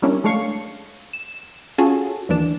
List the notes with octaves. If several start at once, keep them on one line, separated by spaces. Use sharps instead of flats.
G3 A#3 C#4 D4 E4
G#3 A3 D4 C#5 F5 C#6
E7
C#4 F4 F#4 G#4 A4
D#2 E3 D4 E7